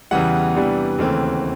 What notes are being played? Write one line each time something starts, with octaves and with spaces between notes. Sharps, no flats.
E2 C#3 E3 G3 F#5
C3 E3 G3 B3 D4
D#2 C#3 E3 A3 C4